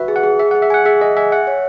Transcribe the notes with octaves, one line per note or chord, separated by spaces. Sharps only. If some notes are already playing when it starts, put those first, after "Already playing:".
Already playing: F#4 B4 E5
G#4
F#5
G#4
G#4 E5
F#5
G#4
E5
F#5 G#5
G#4 E5
G#4 D#5
E5 G#5
E5 F#5
C#5